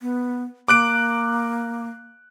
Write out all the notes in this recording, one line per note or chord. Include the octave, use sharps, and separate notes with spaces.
B3
A#3 D6 F#6 D7